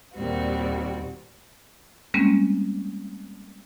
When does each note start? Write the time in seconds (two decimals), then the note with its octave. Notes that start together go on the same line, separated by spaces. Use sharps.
0.16 D#2 A#2 G3 C4 F#4
2.14 G3 G#3 A#3 C4 C#4